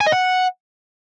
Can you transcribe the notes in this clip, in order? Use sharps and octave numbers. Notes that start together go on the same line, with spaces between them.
G#5
D#5
F#5